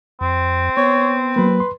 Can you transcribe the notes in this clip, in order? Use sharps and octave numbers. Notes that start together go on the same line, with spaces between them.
F2 C4
B3 C#5
F#3 A#3 B4
C6